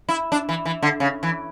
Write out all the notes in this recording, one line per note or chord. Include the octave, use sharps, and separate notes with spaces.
E4
D4
E3
E3
D3
C#3
E3